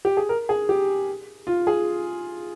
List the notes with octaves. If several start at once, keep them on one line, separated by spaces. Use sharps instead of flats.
G4
G#4
A#4
G#4
G4
F4
G#4